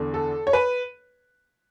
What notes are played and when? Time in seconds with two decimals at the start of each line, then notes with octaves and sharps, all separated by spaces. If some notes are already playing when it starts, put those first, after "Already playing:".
Already playing: E2 D3
0.14 A4
0.47 C#5
0.53 B4